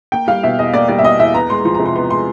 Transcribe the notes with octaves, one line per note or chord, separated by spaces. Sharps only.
A#3 G5
G3 F5
B2 E5
E2 D#5
A#3 D5
G3 D5
E5
B2 D#5
E2 E5
B3 A#5
G#3 C6
F3 C6
A#5
C3
C6
B3 C6
G#3 C6